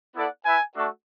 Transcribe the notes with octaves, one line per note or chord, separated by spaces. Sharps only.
B3 E4 A4 D5 F#5
E4 B4 E5 G#5
A3 D4 F#4 A4